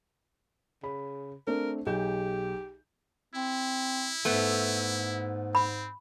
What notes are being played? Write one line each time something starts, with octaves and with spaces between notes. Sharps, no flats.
C#3 B5
A3 C4 D4 A#4
B1 G4 G#4 G6
C4 E4
G#2 A3 B3
C4 B5